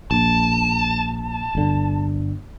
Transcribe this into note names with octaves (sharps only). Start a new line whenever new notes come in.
A#1 A5
G1 D3